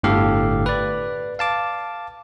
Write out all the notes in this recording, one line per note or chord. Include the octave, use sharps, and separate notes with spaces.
G1 A2 D3 G4 A4 F5
B4 D5
F5 A5 D6